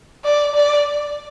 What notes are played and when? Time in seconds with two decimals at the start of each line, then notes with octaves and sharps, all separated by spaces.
0.24 D5
0.55 D5